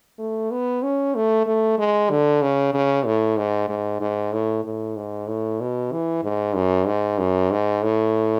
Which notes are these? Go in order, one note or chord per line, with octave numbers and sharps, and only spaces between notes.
A3
B3
C#4
A3
A3
G#3
D3
C#3
C#3
A2
G#2
G#2
G#2
A2
A2
G#2
A2
B2
E3
G#2
F#2
G#2
F#2
G#2
A2